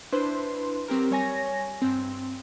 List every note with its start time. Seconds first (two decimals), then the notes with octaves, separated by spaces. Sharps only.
0.13 D4 E4 B4 C5 C6
0.88 F#3 C4 G4 A#4
1.11 G3 C#5 G#5 A#6
1.82 G2 C4